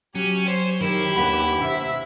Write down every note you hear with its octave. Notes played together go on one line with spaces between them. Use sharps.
F#3 C#4 G4
C5 C#5
D#3 E4 G4 C#5
D#2 D4 B4 F#5 B5
C3 E5